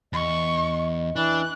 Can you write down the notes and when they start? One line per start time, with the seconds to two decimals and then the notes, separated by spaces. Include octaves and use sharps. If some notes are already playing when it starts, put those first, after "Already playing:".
0.13 E2 D#5 C#6
1.16 E3 D4 F#6